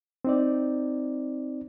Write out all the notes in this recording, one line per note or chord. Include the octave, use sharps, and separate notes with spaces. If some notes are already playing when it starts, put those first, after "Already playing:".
C4 D#4 D5